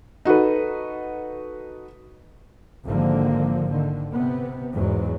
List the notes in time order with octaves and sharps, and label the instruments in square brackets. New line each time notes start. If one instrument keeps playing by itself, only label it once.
[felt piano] D#4 F#4 A4 B4
[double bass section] G#1 D3 F3 A#3
D3 D#3
C3 B3
E2 G#2 F#3